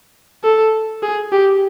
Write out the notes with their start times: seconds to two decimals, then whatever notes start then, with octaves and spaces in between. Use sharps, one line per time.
0.44 A4
1.03 G#4
1.32 G4